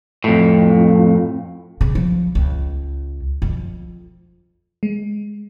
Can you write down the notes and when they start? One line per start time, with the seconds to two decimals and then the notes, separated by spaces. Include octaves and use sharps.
0.24 F2 A2
1.81 C#3
1.95 F3
2.35 C#2
3.42 F2
4.83 G#3